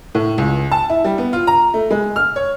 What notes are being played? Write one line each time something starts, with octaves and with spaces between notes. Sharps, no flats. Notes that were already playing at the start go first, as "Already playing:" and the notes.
A2
C#2
A5
E4
G3
B3
F4
A#5
A3
G#3
F6
C#5